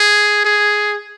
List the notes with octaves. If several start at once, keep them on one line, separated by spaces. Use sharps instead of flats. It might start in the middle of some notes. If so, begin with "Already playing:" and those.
Already playing: G#4
G#4